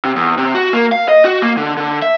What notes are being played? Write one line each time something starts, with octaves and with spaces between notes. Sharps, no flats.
C3
E2
C3
F#4
A#3
F5
D#5
F#4
A#3
D3
D3
E5